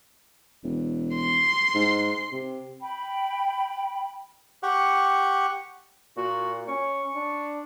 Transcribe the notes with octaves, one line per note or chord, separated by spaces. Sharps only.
E1
C6
G#2
C3
G5 B5
G4 F#5 C#6
A#2 F#4
C#4 C#6
D4